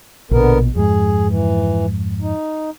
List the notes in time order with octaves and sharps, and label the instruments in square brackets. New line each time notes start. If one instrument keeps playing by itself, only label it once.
[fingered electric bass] A#1 B2 [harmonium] D3 B3 A#4
[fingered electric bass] F2 G#2 [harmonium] G#4
[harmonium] E3
D#4